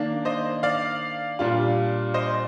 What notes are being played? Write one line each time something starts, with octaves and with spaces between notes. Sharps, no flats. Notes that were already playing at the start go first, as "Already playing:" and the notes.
Already playing: D#3 A#3 D4
C5 D#5
D5 F5
A#2 G3 D4 F4
C5 D#5